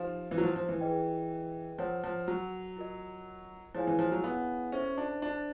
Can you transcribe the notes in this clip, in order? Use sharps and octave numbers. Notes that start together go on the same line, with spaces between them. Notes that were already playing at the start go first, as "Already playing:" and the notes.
Already playing: F3 D#4 G4 C5 F5
E3
F#3
F3
F3
E3
G#4 B4 D#5 G5
F3 A#4 C#5 F#5
F3
F#3
F4 A#4 D#5
F3 E4 G#4 C#5 F5 G#5
E3
F3
F#3
B3
C#4 A4 C5 E5
D4
D4